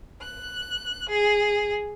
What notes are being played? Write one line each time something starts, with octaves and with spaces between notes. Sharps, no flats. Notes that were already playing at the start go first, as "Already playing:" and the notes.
F#6
G#4